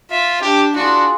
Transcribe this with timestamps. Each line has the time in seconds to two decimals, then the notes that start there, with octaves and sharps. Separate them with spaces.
0.11 F4 E5
0.41 D4 G4
0.76 D4 F4 F#4 G#4